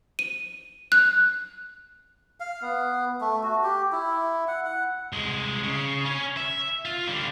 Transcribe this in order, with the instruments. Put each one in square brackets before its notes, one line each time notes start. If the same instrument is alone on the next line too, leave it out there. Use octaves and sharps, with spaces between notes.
[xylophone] D#7
F#6
[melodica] F5
B3
A3
F#4
G4
E4
F#5
F#5
[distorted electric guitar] C2 G#3
C#3
C#4 C#5
E5
F4
D3 G3